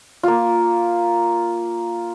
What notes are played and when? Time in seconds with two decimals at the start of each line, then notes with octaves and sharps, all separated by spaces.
0.23 A#3 F4